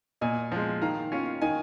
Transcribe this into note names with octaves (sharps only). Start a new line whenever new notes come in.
A#2 D#5 G#5
F3 G#3
D#3 F5 A#5
C#4 F4
D#3 D#5 G#5